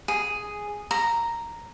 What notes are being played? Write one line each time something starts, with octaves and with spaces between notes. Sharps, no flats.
G#4
A#5